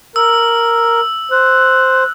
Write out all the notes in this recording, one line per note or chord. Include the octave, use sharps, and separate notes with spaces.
A#4 E6
C5 F#6